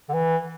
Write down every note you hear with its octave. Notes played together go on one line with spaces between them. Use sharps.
D3
E3